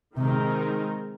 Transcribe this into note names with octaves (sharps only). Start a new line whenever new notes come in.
C3 D#3 G#3 C4 D#4 A#4